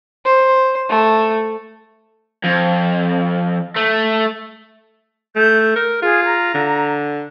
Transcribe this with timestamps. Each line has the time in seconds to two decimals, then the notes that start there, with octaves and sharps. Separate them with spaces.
0.25 C5
0.89 A3
2.44 F2
3.76 A3
5.36 A3 G6
5.76 A#4
6.02 F4 G#4
6.25 A#5
6.54 D3